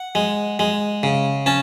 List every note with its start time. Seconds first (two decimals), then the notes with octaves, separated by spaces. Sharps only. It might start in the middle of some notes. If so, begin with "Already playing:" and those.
Already playing: F#5
0.15 G#3
0.59 G#3
1.03 C#3
1.46 C#4 A5